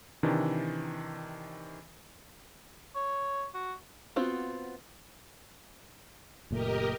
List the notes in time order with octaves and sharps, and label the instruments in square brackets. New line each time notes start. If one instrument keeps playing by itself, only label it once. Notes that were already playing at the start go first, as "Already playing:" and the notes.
[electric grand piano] C3 D#3 E3 D4
[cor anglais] C#5
F#4
[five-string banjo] B3 C4 F4 F#4
[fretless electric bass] F#1 A#2 A3 [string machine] G4 A#4 D#5